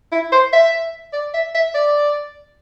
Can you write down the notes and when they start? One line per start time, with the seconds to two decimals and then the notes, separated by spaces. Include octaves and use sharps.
0.12 E4
0.32 C5
0.53 E5
1.13 D5
1.34 E5
1.55 E5
1.74 D5